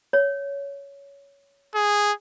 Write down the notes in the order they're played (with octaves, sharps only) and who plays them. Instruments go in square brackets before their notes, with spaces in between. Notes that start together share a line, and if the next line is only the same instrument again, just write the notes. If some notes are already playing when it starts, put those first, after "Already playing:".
[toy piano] C#5
[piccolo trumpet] G#4